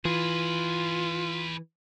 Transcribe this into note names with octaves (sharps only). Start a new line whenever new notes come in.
E3 F4 G#4 B4